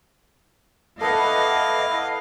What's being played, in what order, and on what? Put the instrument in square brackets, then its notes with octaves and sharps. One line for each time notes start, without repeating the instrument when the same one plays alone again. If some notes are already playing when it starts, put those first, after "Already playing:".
[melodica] E4 D6 [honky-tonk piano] A4 B4 F#5 [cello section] D#5 [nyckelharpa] F5